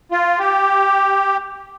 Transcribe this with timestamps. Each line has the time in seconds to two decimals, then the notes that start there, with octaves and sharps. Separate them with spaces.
0.12 F4
0.39 G4